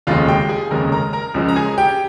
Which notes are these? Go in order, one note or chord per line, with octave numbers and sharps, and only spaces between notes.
F1 D#2 C#3 G#3 F4 F5
G4 G5
G#4 G#5
F1 D#2 C#3 G#3 A#4 A#5
A#4 A#5
A#4 A#5
C#2 C#3 F3 G#3
A#5
G#4 G#5
G4 G5